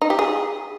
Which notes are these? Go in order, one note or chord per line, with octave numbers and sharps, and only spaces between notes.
D#4
G4
G#4